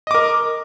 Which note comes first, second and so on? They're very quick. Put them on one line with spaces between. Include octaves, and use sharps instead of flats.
D#5 D6 A#4